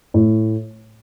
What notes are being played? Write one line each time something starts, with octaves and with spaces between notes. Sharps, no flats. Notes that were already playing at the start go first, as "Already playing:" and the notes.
A2